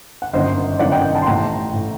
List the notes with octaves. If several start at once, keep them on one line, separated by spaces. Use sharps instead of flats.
F#5
G1 F#2 D#3 C5 D#5
G1 F#2 D#3 D5 F#5
D#5 G5
D#5 G5
F#5 A5
C6
A1 A2 G5 A#5
A2